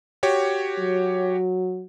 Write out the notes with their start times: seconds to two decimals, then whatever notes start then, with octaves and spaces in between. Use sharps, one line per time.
0.23 F#4 G4 C#5
0.79 F#3